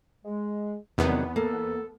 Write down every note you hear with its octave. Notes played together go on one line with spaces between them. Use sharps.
G#3
E2 C3 D#3 F#3 G3 B3
A#3 A4